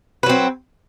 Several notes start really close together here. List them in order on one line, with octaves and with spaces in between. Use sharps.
B4 F#3 C4